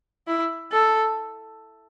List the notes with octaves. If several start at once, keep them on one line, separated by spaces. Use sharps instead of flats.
E4
A4